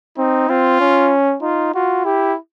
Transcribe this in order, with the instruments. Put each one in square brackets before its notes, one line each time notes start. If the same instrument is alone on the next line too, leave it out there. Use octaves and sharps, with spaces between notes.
[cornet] C4 [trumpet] D#4
[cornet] C4 [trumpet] F4
[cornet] C#4
[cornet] D#4 [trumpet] F4
[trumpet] F4 [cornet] F#4
[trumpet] E4 [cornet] G4